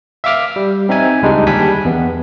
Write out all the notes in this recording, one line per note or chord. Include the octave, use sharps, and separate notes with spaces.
E5 F5 D6 F6
G3
C4 D#4 E5 G#5
C#2 G3 G#3 D4 D#4
D#2 G3 D4 G#5 B6
E2 B3